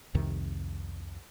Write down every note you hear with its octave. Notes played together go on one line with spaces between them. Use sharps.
C2 F2 C3 D#3